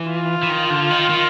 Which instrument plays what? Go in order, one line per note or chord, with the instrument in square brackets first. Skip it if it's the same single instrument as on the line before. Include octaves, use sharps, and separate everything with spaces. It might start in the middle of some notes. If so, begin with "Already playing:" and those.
Already playing: [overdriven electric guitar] E3
[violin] F4
[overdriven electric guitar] E3
D#3
D3
D#3
D#3